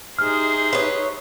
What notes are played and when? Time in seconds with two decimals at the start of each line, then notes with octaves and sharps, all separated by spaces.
0.18 D#4 G4 G#4 C5 E5 F6
0.73 B4 C#5